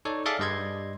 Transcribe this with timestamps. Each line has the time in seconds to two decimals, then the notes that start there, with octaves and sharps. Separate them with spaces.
0.05 D#4 A4 C#5 D5
0.26 G#4 A4 D5 E5 F5 D6
0.39 G2 G3 D#5 C6 G#6